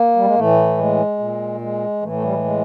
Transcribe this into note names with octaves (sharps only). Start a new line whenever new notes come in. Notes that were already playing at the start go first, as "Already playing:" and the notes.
Already playing: A#3
G3
G#3
A2 E3 A3
G#3
A#2
G#3
A2 E3 A3
A3
G3
G#3
G#3